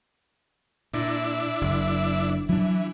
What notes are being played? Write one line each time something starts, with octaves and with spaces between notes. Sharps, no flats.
A#2 D4 E4
F#1
E3 F#3 D4